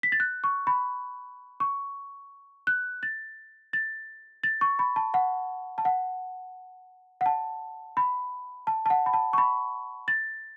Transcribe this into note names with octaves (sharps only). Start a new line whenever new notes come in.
B6
A6
F#6
C#6
B5
C#6
F#6
A6
A6
A6
C#6
B5
A5
F#5
A5
F#5
F#5
A5
B5
A5
A5
F#5
B5
A5
C#6
B5
A6